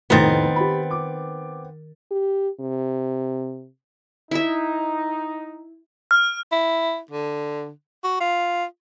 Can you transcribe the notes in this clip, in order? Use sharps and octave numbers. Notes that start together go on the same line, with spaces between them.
F1 A2 D#3 B3 C4 D#4 A6
G4 B5
D6
G4
C3
D#4 E4 E5
F6
E4
D3
F#4
F4